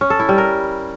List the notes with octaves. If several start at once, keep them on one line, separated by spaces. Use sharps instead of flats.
C#4
A4
E4
G3
A#4